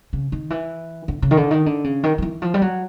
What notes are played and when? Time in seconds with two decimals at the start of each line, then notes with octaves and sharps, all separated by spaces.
0.13 C#3
0.32 D#3
0.50 E3
1.08 D3
1.22 C#3
1.31 D#3
1.37 D3
1.51 D#3
1.66 D3
1.84 C#3
2.03 D#3
2.18 D#3
2.22 E3
2.42 F3
2.54 G3
2.62 F#3